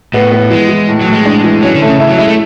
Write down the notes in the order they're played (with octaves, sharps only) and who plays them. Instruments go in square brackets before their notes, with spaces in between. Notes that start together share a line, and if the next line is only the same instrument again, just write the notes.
[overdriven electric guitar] A2 [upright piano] B3
[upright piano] B3
[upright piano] E3 [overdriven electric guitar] G#3
[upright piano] E3
A2
[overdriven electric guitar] F#3
[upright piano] A2
[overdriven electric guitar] G#3
[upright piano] D4
E3
[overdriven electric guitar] F#3 [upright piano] C#4
[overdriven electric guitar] D3
[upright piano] A3
[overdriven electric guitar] C#3
[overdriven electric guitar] C#3 [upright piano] E4
[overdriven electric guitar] F#3
[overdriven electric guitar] G#3 [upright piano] E4
[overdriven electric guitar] A3